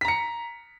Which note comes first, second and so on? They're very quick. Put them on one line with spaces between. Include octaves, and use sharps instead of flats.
B6 A#5 C#7